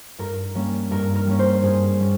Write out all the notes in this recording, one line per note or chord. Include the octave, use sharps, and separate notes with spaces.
G2 A#4
G3 A#3 C#4
G2 A#4
A#4
G3 A#3 C#4
C5
G2 G#4
G3 A#3 C#4